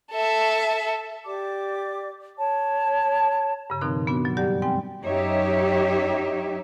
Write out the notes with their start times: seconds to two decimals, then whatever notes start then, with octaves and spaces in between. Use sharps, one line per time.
0.11 A4 E5
1.26 G4 D5 D6
2.38 C#5 A5
3.70 G2 C#3
3.81 B2 D#3 F3 C4 D#4 A#4
4.07 B3 D4 F#4
4.25 F#3 F#5
4.37 F#2 G3 G4 D5 F#5
4.62 G#3 C4 G5 G#5
5.03 F#2 D#4 G4 C#5 E5